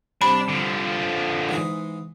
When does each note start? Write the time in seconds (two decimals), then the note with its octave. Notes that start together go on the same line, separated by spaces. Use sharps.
0.22 C3 G3 C4 D4 B5
0.49 D3 F3
1.49 G#2 E3 G#4